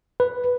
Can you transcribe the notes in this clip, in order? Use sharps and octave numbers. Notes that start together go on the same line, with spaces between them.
B4